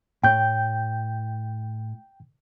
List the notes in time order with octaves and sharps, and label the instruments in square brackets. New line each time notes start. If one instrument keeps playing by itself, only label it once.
[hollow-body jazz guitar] A2 [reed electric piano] G5 G6